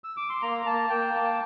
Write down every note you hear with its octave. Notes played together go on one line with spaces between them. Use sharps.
E6
D6
C6
A#3 A#5
A#3 A5
A#3 G5
A#3 A5